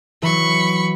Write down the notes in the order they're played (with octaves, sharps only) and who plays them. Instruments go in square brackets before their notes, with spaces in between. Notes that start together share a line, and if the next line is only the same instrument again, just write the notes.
[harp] E3 F#3 [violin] B5 C#6